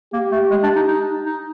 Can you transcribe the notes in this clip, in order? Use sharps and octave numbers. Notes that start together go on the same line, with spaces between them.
A#3 G4
A3
G#3
D4
D#4
D#4
D#4